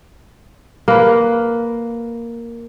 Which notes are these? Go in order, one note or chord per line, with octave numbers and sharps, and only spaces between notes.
A#3 B4